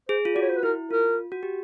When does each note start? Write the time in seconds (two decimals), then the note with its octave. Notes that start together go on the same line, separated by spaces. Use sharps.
0.08 G#4 C5
0.25 F4
0.35 F#4 D5
0.42 C#5
0.49 C5
0.57 B4
0.63 E4 A#4
0.91 F4 A#4
1.32 F#4
1.43 G4